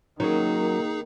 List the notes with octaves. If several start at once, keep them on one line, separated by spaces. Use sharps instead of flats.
D#3 F#3 A#3 C#4 D#4 G#4